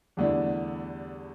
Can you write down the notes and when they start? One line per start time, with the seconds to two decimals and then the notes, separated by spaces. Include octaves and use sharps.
0.17 E2 G2 D3 A3 D4 E4